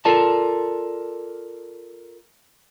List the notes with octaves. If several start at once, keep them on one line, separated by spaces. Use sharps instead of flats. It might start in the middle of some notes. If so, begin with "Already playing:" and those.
F4 A4 A#4 D5 A5